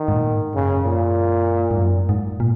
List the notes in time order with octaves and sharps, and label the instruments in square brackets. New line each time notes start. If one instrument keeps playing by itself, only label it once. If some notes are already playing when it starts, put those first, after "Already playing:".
Already playing: [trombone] D#3
[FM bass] G#2
A#2
G#2
[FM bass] F#2 [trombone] C#3
[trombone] A#2
[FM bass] G#2
F#2
G#2
A#2